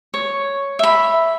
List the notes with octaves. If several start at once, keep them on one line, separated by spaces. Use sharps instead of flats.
C#5
E5 B5